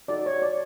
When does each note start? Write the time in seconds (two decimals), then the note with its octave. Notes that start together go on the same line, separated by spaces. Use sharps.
0.08 D#4 F#4 A4 D5
0.26 C#5
0.42 D5